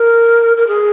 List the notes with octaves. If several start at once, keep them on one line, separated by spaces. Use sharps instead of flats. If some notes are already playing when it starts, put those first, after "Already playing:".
Already playing: A#4
A#4
G#4